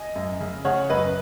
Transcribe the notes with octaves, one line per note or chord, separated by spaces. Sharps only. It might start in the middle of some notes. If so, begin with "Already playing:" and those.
Already playing: D#5 G#5
F#2
C#3
C#3 C#5 F#5
F#2 B4 D#5